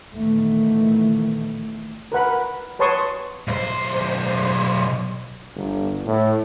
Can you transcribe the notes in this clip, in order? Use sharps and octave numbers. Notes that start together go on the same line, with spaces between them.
A#2 D#3 E3 A3 B3
A#4 B4 F#5 B5
B4 C#5 A5 C6 C#6 D#6
B1 C5
G1
A2